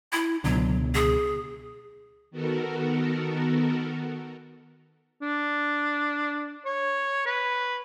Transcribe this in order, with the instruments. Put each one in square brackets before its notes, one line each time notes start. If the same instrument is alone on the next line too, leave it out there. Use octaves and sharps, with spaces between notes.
[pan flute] E4
[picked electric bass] C#2 B2 D3 [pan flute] F#3
[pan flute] G#4
[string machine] D#3 B3 F#4 A4 A#4
[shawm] D4
C#5
B4